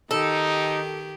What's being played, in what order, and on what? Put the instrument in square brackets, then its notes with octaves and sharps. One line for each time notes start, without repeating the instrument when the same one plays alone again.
[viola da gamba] D#3 G4 [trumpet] D#4 [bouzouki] A4